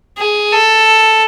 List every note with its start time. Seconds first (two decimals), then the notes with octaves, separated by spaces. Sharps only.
0.18 G#4
0.52 A4